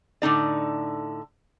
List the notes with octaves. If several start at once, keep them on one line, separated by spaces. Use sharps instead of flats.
A2 D3 D#4 D5